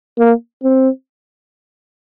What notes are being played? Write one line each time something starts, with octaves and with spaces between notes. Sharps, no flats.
A#3
C4